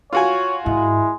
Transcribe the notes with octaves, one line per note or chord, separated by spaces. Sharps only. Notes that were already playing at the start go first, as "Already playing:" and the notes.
F4 F#4 C#5 G#5
G#2 D#3 G#3 E4